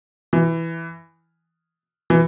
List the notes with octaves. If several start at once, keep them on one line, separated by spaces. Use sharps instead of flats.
E3
E3